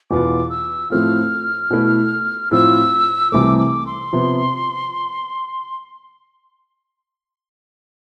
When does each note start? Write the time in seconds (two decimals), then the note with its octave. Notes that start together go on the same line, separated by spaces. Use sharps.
0.11 E2 B2 B3 F4 D6
0.50 E6
0.90 A2 F3 A3 C4 F4 F6
1.71 B2 A3 E4
2.51 A2 F3 C4 F4 E6
3.32 C2 C3 E3 A3 D6
3.58 D6
3.86 C6
4.13 C3 F3 B3